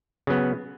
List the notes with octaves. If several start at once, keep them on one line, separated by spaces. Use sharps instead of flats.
C#3 F#3 B3